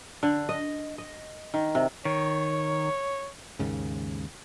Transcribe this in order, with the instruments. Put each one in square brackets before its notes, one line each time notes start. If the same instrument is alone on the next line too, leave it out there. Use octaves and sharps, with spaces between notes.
[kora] D3
D#5
D#5
D#3
C3
[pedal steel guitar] D#3 [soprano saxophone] C#5
[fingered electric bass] D#2 G#2 C#3